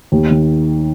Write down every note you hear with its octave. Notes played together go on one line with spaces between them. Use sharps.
D#2
D#3